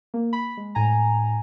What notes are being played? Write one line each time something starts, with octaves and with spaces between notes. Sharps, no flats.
A#3
B5
G#3
A2 G#5 A#5